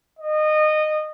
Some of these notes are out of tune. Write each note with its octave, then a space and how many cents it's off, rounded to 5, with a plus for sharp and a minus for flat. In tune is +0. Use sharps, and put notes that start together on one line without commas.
D#5 -20